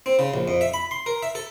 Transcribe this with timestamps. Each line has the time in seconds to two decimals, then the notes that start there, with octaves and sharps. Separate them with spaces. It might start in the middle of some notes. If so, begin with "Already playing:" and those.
0.06 C4
0.19 C#3
0.34 A#1
0.48 F2
0.61 E5
0.74 B5
0.91 C6
1.06 A#4
1.23 E5
1.35 A4